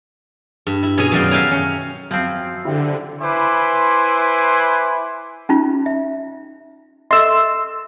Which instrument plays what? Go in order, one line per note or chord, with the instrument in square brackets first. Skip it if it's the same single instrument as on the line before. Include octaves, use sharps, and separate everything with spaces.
[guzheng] G2
E4
B2 C#4 G#4 G#5
F#2 D#3 F#3 D5 F5 G5
E5 F5 G5 G#5 A#5
C#4
[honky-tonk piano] F#2 G#6 [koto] F3 C4
[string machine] D3 [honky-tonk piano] E4 G4
[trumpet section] E4 B4 C5 G#5 C6 D6
[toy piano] C#4 D#4 F4
E5
[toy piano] A4 D#5 E5 [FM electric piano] C6 E6